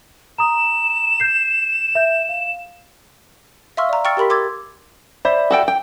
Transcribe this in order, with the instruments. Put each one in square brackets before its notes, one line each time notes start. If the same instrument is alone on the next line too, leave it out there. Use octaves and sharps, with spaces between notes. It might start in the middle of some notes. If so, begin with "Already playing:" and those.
[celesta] A#5 D#6 [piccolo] E7
[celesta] G6 C7
E5 G6
F5
[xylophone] E5 F5 C6 C#6 E6 F6
D5 A#5
G5 C#6 E6 F6 A6 C#7
G4 A#4 B5 C6 B6
C6 D6 E6 G#6 A6
[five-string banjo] C5 [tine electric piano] D5 E5 B5
[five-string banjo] F#4 A4 G5
G5